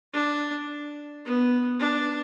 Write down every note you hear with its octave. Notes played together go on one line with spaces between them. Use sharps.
D4
B3
D4